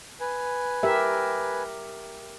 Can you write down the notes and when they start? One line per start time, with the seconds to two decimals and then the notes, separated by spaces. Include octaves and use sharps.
0.20 B4 G#5
0.83 G4 A#4 E5